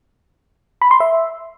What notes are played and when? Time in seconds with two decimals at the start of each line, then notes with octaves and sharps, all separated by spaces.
0.82 B5
0.91 C6
1.00 E5